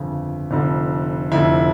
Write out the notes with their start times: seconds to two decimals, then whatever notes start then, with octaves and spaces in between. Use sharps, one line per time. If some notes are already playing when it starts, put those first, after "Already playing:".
Already playing: G1 F2 C#3
0.51 F1 F2 D3
1.32 F1 F2 D3 E4